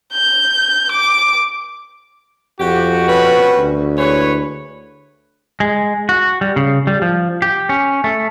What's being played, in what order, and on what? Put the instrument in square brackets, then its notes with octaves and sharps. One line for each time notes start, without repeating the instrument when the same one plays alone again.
[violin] G6
D6
[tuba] F2 [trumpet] F#4 [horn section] G4
[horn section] G3 C#4 B4
[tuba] D2
[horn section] G#3 E4 C#5 [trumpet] B4
[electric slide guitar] G#3
F#4
G3
C#3
G3
F3
G4
C#4
A3